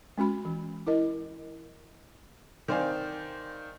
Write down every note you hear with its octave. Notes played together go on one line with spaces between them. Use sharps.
G#3 C#4 F#4 B5
E3
E4 A#4 D#5
D#3 C4 C5 D5 F5 G#5